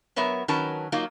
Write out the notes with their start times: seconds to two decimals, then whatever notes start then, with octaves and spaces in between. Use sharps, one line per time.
0.16 F#3 B3 A#4 C#5 E5
0.48 D#3 F#3 C#4 A#4 B4 A5
0.92 F#3 A#3 D#4 F4